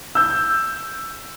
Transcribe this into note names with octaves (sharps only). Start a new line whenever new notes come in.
E6 G6